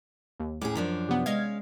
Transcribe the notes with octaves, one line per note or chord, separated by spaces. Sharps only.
D#2
A2 C#4 G#4 D6
F#2 F3 D4
C3 B3
G#3 C#4 D#5 F5 F6 G#6